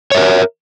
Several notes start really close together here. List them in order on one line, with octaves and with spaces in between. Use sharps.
C#5 E5 A#4